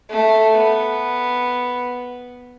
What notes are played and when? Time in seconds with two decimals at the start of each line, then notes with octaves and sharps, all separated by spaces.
0.10 A3
0.57 B3